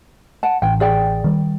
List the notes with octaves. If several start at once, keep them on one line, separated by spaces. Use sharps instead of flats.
F#5 A5
A1 G5
G#4 D5 G5
D#3 G3